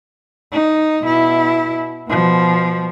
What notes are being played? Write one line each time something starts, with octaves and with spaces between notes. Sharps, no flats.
D#4
B2 E4
B2 F3